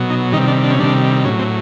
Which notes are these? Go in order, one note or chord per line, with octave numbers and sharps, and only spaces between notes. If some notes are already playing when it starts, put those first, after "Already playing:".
Already playing: B2 F#3
D#4
C3 D#3 G3 D#4
D4
D4
C#4
C3 D#3 G3 D4
A2 F#3 C#4
C4